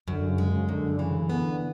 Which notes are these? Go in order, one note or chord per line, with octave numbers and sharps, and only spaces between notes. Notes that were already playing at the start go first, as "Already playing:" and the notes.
F#2 D3
C#3
G#3
C#3
F#2 D3
C#3 E3
D3 B3